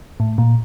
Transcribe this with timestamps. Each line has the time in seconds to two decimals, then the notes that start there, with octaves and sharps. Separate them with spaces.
0.20 A2
0.38 A#2